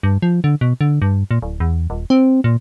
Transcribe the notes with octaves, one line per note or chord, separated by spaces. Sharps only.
G2
F3
D3
B2
D3
G2
A#2
D1
E2
D#1
C4
A#2